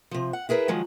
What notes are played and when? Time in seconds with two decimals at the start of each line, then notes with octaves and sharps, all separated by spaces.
0.11 C3 F3
0.33 F#5
0.49 E4 G#4 A#4 B4
0.68 D#3 F3 F#3 G#3